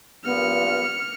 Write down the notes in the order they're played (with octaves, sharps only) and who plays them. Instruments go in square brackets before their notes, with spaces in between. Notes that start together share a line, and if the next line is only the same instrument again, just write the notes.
[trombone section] A#1 G2 A#2 [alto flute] B3 [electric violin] F6 C#7